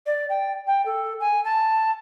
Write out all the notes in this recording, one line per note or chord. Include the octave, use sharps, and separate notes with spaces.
D5
G5
G5
A4
G#5
A5